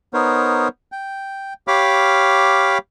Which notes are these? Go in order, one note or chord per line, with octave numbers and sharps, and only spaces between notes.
B3 D#4 A#4 C5 C#5
G5
G4 C#5 F5 B5 D6 F6